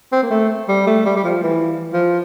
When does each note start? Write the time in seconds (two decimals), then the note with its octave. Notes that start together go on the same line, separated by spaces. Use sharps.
0.12 C4
0.23 A#3
0.31 A3
0.68 G3
0.87 A3
1.06 G3
1.16 G3
1.24 F3
1.43 E3
1.93 F3